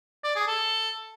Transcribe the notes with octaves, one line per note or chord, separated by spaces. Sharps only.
D5
G#4
A4